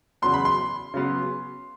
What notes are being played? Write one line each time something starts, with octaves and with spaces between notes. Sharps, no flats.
E2 C#3 F#3 B3 C6
B5
C6
C#3 F#3 B3